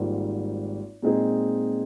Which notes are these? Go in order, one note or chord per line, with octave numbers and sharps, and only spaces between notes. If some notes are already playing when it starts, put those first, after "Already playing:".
Already playing: G#1 G#2 G3 A#3 F4
A#2 G#3 C4 D#4 G#4